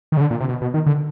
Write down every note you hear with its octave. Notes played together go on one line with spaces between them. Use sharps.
D#3
C#3
D3
A#2
C3
B2
B2
D#3
D3